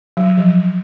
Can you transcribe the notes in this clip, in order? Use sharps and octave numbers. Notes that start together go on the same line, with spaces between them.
F#3
F3